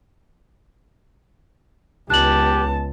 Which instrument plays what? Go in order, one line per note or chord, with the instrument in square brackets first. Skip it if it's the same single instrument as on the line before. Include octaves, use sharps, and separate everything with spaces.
[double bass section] C#2 [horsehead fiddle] B3 A5 [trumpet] G4 [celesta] F#6 F#7